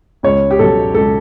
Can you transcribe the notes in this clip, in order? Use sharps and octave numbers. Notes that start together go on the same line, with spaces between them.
C#2 C#5
G4
B2 F#3 A4
C#2 A4